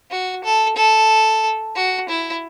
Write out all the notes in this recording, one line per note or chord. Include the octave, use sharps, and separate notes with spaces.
F#4
A4
A4
F#4
E4